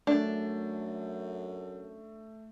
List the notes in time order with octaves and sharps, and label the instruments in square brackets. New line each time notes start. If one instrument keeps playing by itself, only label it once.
[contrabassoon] F#2 [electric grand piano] A3 [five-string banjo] D4